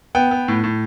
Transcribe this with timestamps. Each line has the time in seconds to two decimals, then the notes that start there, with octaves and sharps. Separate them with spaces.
0.15 B3 G5
0.31 B3
0.48 A2
0.64 A2